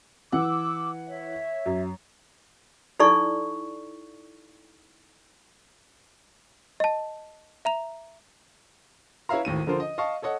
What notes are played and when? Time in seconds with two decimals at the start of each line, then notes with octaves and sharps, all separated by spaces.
0.32 E3 F#5 D6 E6
1.07 C#5 E5
1.66 F#2
2.99 D#4 E4 A4 D5 C#6
6.80 D#5 A5
7.65 E5 A#5 F7
9.29 E4 B4 C#5 E5 F5 A#5
9.45 G#1 D#2 A2 D#7
9.67 D3 F3 F4 A#4 C5
9.80 D#5
9.98 D#5 F5 A5 C#6
10.22 A4 C#5 D#5 F#5